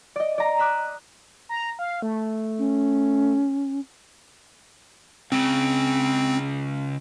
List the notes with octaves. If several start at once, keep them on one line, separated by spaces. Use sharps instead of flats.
D5 D#5
D5 A#5
D6 D#6 F#6 B6 E7
A#5
F5
A3
C#4
C#2 C#3 C4